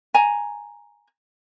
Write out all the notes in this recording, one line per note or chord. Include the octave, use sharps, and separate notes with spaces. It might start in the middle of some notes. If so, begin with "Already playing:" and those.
G#5 A#5